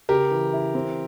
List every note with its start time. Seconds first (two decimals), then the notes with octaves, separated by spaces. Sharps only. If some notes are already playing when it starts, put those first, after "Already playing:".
0.09 C#3 G4 A#4
0.31 E3
0.53 E4
0.75 C4